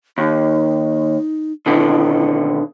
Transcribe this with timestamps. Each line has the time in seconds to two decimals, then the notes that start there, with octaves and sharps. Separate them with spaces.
0.18 D#2 D#4
1.66 B2 D3 D#3 E4